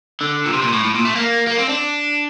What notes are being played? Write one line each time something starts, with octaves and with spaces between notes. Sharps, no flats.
D3
A#2
C3
A#2
A2
A2
A#2
A3
A#3
A#3
C4
D4